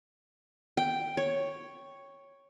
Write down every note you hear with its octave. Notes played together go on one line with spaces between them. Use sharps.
G5
C#5